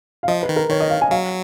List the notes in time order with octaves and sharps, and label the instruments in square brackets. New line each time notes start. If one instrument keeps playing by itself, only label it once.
[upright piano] F5
[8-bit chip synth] F3 [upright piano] D#5
[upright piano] B4
[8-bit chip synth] D#3
[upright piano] A#4
[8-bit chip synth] D#3 [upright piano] C#5
[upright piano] D#5
F5
G#5
[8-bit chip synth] F#3 [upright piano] F5